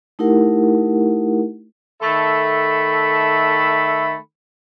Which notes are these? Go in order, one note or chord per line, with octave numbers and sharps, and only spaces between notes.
A3 D#4 E4 G4 A#4 F#5
D#3 A3 A4 E5 B5